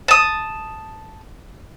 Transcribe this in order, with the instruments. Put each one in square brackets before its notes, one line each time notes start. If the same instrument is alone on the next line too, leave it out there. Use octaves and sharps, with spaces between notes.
[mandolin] A5 D#6